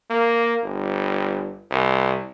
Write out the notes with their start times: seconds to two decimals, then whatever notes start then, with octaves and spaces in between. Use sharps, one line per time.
0.10 A#3
0.64 G1
1.71 C2